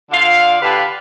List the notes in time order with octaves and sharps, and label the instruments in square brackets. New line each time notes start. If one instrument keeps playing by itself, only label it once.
[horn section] D3 F4 D5 F5
D3 G4 B4 F5 A5 B5